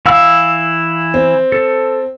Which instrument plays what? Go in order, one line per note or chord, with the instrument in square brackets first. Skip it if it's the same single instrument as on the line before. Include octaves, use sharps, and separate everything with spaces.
[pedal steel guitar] E3 E4 E6 [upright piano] F5
[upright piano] C4
[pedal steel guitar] A4